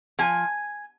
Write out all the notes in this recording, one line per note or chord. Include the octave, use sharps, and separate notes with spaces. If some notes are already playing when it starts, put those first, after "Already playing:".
F3 G#5